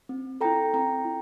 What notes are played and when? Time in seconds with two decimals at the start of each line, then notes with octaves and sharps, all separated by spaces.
0.09 C4
0.41 E4 A4 G5 A#5
0.73 C4 G5 A#5
1.05 E4